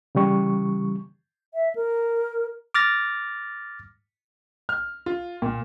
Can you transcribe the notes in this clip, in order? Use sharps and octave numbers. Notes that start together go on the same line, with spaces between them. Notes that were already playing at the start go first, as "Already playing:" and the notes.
C#3 E3 G3 C#6
E5
A#4
D6 F6 A6 A#6
F6
F4
A#2